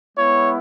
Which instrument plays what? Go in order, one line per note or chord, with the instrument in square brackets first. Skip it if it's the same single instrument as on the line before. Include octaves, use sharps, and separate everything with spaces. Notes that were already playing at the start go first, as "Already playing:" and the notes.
[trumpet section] G#3 B3 E4 C#5